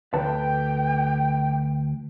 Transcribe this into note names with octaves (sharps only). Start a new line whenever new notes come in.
D2 B4 G5 A5